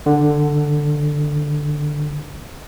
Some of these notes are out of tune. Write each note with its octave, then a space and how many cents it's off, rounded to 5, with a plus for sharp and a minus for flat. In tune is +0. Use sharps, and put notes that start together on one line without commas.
D3 +10